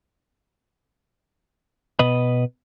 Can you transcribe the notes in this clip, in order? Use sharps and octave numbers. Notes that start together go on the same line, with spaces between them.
B2 B4 D#5 B5